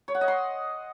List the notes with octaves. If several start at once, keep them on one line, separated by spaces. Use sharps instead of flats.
C#5
F#5
D#5
C6